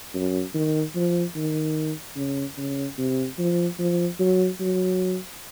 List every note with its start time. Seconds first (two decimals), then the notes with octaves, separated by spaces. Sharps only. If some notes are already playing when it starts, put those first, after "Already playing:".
0.14 F#2
0.54 D#3
0.95 F3
1.36 D#3
2.16 C#3
2.58 C#3
2.98 C3
3.39 F3
3.79 F3
4.19 F#3
4.60 F#3